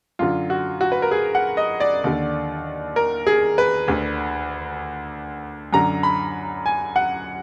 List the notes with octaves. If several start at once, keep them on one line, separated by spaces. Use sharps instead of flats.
F#2 D3 F4
F#4
F#4
B4
A#4
G#4
F#5
D#5
D5
D#2 D3
A#4
G#4
B4
D2 D3
F#2 D3 A#5
B5
G#5
F#5